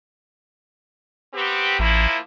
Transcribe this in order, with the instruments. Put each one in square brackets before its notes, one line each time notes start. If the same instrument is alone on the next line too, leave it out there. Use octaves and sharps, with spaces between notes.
[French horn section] B3 C4 G4
[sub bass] A1 [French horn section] F3 A#3 E4